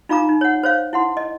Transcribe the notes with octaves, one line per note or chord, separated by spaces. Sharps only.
D#4 F4 F5 A#5 D6
D#4
C#5 F#5
C5 C#5 F5
E4 F#5 C6
D#5